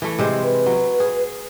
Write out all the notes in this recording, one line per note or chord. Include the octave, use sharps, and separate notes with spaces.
E3 A3
C3 G#3 C5
B4
F#3
G#4